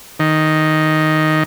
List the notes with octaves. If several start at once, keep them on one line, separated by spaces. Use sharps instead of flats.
D#3